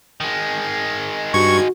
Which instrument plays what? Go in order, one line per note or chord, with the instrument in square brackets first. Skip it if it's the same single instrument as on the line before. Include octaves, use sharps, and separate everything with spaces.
[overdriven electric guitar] D#3 G#3
[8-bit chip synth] G2 G#6 [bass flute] F#4 [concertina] C#6